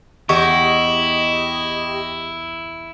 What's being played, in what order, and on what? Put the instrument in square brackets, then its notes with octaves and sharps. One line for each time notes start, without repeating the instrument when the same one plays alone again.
[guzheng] E2 [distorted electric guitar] E4 [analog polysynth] G4 D#5 [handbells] C#6